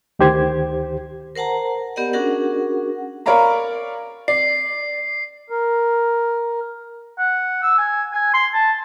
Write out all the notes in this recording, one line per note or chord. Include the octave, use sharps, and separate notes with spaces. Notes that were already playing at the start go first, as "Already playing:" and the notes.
D2 D#3 G4 C5 G#6
A#4 C5 F#5 A5 A#5
B3 G4 A#4 D5 D#5 F#5
C#4 D4 F#4 G#4 A#4 F#5
A#4 C#5 D5 F5 A#5 B5
D5 C7
A#4
F#5
E6
G#5
G#5
C6
A5